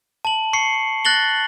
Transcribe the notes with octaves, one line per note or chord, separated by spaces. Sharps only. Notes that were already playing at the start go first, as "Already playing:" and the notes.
A5 F#7
C#6 C7 C#7
F#6 A6 A#6 F#7 G7